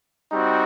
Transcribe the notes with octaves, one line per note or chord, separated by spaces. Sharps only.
G3 C4 D#4 F#4